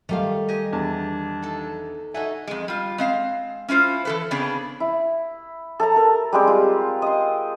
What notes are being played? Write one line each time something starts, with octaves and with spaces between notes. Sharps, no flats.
D#3 G3 A3 F5
G4 D#5 G#5
E2 D4
D#4 A4
D#4 F#4 A4 E5 G#5
F2 G#3
G3 F4
G#3 C4 F5
C#4 E4 F4 C5
E3 A4 B4
C#3 B3 C4 D4 G#4
E4
A4 A5 A#5
A#4
G3 G#3 C4 G4
F4
D#5 C6